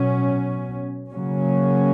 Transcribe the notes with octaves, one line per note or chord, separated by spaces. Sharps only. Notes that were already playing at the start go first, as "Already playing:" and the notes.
Already playing: B2 F#3 C#4
C#3 F#3 A#3 C#4